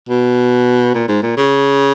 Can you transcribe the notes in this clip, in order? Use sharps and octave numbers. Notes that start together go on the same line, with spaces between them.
B2
A#2
G#2
A#2
C#3